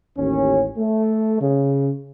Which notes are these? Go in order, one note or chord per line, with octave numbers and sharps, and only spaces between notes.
A1 D#2 C#4
A3
C#3